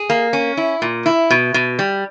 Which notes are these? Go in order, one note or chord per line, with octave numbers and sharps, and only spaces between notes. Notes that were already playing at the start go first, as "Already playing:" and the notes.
Already playing: G#4
A#3
C#4
E4
A#2
E4
B2
B2
G3